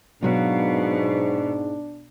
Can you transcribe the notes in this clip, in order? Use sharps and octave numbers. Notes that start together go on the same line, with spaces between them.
G#2 B2 F#3 D4 F#4 F5